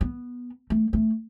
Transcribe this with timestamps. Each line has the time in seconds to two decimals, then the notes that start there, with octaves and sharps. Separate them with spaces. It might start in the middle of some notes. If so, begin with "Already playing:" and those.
0.01 B3
0.70 A3
0.93 A3